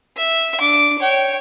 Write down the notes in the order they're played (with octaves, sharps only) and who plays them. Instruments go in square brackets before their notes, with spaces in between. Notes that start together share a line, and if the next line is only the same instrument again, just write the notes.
[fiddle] E5
D4 D6
C#5 G5